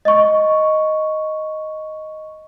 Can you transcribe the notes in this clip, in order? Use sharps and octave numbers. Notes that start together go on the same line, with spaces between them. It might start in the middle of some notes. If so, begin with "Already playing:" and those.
D#5 C#6